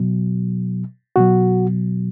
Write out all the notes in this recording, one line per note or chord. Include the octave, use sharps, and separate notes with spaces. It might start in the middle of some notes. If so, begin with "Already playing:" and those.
Already playing: B2 F#3
B2 F#3 F#4